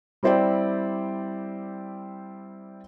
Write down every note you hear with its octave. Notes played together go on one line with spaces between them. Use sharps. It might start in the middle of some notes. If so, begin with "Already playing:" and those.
G3 C4 E4 C5 D5 G5